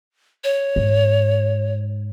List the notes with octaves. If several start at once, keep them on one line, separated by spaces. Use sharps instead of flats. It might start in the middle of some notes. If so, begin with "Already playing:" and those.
C#5
G#2